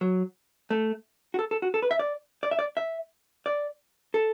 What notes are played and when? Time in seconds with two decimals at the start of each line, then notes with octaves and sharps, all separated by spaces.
0.01 F#3
0.70 A3
1.34 F#4
1.39 A4
1.51 A4
1.62 F#4
1.74 A4
1.82 B4
1.91 E5
1.99 D5
2.43 D5
2.51 E5
2.59 D5
2.77 E5
3.46 D5
4.14 A4